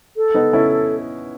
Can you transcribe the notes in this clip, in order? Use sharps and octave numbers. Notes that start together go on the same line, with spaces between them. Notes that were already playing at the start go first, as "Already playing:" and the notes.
A4
B3 D#4
C#4 E4